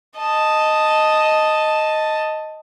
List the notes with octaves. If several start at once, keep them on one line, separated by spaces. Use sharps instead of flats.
D#5 A5